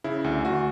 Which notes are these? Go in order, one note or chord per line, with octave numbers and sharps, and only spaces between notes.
C#3 E4
D2
D2 F#4